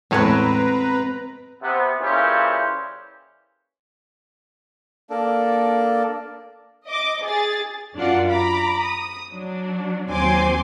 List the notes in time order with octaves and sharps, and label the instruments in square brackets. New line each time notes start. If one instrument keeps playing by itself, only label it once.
[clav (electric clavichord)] E2 A2 C#5 [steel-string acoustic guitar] G#3 B3 C4 [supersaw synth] B4 A#5
[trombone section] C3 B3
A#2 C#3 E3 C#4 G4 C5
[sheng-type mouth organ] A#3 D4 A4
[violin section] D#5 D6
G#4 A6
[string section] F#2 D4 F4 A#4 D5 F#5
A#5 B5 D6
D#6
F#3 D4
D#2 F#3 C4 G#5 C6 D6